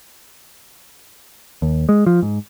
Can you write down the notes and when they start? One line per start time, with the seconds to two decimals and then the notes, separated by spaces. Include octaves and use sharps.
1.62 D#2
1.89 G#3
2.06 F3
2.22 G#2